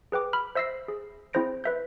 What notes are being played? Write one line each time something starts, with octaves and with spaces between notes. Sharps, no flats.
G#4 B4 G5 D6
B5 F6
C5 E5 E6 A#6 C7
G#4
C4 E4 G#4 C5 A#6 D7
B4 E5 G6